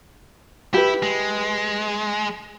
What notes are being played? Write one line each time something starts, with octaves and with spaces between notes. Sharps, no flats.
E4 G4 B4
G#3